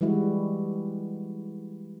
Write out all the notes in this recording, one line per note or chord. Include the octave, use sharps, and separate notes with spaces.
E3 G3 G#3 E4 F#4